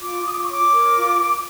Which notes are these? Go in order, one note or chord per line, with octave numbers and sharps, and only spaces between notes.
F4 D6
F4 D#6
D6
C#6
C#5 D6
A#4
F4